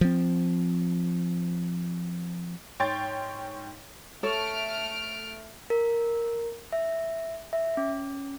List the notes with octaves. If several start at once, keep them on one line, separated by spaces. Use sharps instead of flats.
F3 C4
G#2 C#5 G5 C6 A6
A3 A4 C#5 F6 D7
A#4
E5
E5
C#4